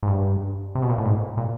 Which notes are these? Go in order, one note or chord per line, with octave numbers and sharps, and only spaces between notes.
G#2
G2
C3
B2
A#2
A2
G#2
A#2